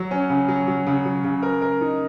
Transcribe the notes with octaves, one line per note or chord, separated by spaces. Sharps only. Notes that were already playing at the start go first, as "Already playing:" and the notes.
Already playing: F#3
C#4
C#3
F#3
F#3
C#3
F#3
C#3
A#4
A#4
D#4